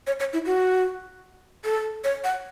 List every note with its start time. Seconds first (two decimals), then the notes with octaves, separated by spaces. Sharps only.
0.07 C#5
0.20 C#5
0.33 E4
0.46 F#4
1.65 A4
2.04 C#5
2.24 F#5